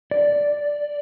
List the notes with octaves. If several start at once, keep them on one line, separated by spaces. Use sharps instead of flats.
D5